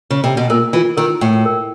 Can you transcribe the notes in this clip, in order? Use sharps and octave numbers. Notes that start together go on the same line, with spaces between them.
C#3
C3
B2
A#2 A#4
E3 F4
D#3 A#4
A2 G5
A#4